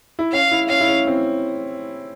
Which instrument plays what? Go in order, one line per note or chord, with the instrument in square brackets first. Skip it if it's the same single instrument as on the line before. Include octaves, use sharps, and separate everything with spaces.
[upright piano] E4
[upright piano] C#4 [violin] F5
[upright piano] E4
[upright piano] C#4 [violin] F5
[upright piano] E4
C#4
C4